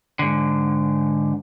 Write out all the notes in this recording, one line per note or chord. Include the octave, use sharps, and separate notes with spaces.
G#2 D3